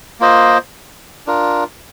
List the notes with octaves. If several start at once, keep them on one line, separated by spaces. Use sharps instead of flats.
A#3 F4 C5 D#5
D4 F4 A#4